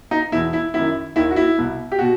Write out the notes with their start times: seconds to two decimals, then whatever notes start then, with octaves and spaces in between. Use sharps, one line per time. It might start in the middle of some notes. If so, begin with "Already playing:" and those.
0.11 D#4
0.32 E2 B2 E4
0.53 E4
0.74 F#2 D#3 E4
1.16 D#2 D#3 E4
1.31 F#4
1.36 E4
1.58 C2 B2
1.92 G4
1.99 B2 F#4